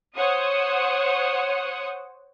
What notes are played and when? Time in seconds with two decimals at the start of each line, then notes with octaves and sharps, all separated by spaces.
0.16 C5 C#5 F#5 D#6